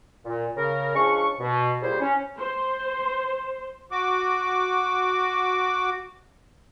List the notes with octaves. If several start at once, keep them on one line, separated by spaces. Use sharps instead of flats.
A#2
C#3 A#4
F3 G#3 C#4 D4 C#6
B2
A#2 C#3 G3 E4 C5
C#4
C5
F#4 D6